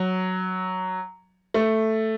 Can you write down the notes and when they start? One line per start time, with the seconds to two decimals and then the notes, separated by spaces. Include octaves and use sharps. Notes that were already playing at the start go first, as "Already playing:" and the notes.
Already playing: F#3
1.54 A3